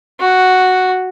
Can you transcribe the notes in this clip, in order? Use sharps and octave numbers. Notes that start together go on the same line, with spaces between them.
F#4